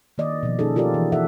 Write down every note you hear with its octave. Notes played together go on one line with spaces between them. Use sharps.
D#3 A#3 D5 D#5
B2 F3
A#3 C#4 D#4 G#4 A4
E4 F4 G4 A4 A#4 D5
E3
E3 A4 D5 E5 F#5